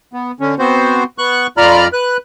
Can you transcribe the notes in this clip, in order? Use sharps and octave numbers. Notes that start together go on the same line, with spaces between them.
B3
D3 C#4
B3 C4 F#4 C5
B3 C#6 F#6
F2 F4 D5 A#5 B5 F6
B4 F#6